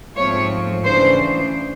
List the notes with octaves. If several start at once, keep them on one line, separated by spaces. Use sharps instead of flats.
G#2 F3 A3 C4 C#5
C#3 E3 A3 D4 C5